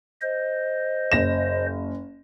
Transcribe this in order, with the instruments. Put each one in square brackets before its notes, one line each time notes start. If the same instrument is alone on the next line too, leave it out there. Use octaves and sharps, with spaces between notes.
[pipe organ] C5 D#5
[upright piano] F#1 A#6 E7